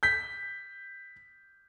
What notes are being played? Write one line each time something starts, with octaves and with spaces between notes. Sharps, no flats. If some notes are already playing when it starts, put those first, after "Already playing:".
G6 B6